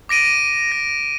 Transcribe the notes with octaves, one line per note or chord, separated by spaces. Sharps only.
D6 A#6 D7 D#7
A#6